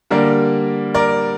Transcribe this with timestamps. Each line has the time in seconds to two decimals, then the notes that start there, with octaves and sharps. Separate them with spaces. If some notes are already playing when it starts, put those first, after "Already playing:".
0.11 D3 G3 A#3 A#4 D5
0.94 A#4 D5